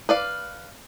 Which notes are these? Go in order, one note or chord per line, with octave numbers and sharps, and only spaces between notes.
B4 D5 F5